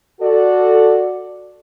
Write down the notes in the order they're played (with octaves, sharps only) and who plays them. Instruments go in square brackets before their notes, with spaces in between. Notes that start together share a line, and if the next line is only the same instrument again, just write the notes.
[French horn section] F#4 A4 D5